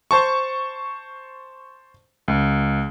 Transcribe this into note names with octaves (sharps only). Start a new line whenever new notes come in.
C5 A5 C#6
C#2